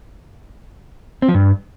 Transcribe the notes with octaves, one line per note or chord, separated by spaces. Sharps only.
C4
F3
G2